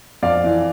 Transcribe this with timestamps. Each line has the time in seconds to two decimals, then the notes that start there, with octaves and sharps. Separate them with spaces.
0.23 F2 D5 F5
0.44 E3